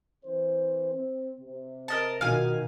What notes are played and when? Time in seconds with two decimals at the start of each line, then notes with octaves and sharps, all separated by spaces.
0.25 E3 C4 C5
0.92 C4
1.40 C3
1.88 A#4 D#5 A5
2.21 B2 D#3 D#4 F4 F#4 F5 G#5